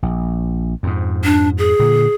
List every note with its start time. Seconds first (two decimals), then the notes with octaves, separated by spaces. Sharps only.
0.03 A#1
0.83 F2 G#2
1.24 D4
1.58 G#4
1.79 A#2 D3